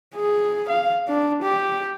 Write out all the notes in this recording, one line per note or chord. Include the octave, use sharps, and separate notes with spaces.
G#4
F5
D4
G4